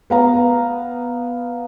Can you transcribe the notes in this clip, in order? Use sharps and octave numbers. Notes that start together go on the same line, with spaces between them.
B3 F5 A#5